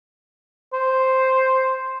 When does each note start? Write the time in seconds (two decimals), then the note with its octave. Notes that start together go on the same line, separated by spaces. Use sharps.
0.73 C5